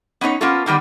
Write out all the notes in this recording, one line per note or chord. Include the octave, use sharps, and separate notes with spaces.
B3 C#4 D#4 C#5
A#3 B3 C#4 F4 A4
D3 D#3 G3 B3